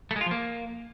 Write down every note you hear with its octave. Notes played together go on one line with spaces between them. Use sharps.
A3
G#3
F4
F3
A#3